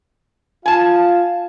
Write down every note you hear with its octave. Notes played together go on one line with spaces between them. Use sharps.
F4 F5 G#5 A5